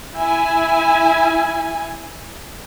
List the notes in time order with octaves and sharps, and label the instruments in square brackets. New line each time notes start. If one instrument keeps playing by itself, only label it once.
[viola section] E4 G#5